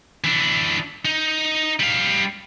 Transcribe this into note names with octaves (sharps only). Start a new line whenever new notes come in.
E3 D4
D#4
G3 F5